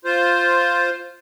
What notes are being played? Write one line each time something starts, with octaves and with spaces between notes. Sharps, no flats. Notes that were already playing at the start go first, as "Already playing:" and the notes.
F4 C5